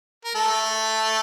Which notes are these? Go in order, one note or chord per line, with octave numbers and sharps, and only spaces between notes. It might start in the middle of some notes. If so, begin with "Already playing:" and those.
A#4
A3 A4